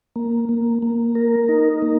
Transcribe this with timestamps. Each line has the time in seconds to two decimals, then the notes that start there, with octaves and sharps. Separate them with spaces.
0.16 A#3
0.49 A#3
0.82 A#3
1.15 A#4
1.49 D#4
1.82 A#3